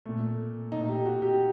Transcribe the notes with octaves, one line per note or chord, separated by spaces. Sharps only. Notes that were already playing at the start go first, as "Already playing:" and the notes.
A#2 A3
A#2 A3 D#4
G4
F#4
G4